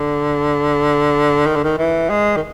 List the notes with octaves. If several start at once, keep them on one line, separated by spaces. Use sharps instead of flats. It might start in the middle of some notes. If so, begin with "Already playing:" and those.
Already playing: D3
D#3
D3
D#3
E3
G#3
D#3